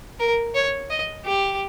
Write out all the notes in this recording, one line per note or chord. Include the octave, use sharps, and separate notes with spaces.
A#4
C#5
D#5
G4